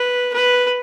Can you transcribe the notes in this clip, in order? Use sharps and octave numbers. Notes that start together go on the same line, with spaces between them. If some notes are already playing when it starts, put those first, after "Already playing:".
Already playing: B4
B4